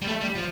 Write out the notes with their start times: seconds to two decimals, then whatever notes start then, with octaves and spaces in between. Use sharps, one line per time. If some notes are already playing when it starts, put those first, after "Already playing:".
0.02 G3
0.07 A3
0.21 G3
0.35 F3